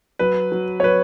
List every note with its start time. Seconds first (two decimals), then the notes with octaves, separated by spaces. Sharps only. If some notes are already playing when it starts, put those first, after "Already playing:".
0.19 F#3 B4
0.52 F#3
0.80 C#5
0.83 F#3 B4